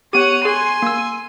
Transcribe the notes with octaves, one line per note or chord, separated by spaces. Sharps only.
B3 G4 C#5 F#5 D#7
G#4 G#5 C6
A#3 E6